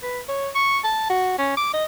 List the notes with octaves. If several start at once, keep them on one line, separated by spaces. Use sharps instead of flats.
B4
C#5
C#6
A5
F#4
C#4
D6
D#5